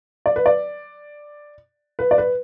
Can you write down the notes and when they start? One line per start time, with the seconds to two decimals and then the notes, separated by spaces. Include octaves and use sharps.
0.26 D5
0.36 B4
0.46 D5
1.99 B4
2.11 D5
2.18 B4